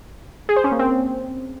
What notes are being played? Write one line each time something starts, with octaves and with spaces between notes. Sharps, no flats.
G#4
C5
C#4
A#3
C4